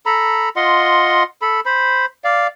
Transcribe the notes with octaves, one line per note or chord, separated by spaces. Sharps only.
A4 A#5 B5
F4 D#5 F#5 C6
A4 B5
C5 B5
D5 F5